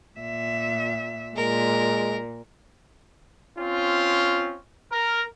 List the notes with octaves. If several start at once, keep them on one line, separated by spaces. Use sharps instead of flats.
A#2 E5
A#2 G#3 A#4
C4 C#4 F4
A#4